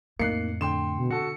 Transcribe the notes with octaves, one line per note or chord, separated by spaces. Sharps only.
F2 A2 A#3 D#4 F#6 C7 C#7
D3 G5 C6 E7
B2
F#4 A4 C#7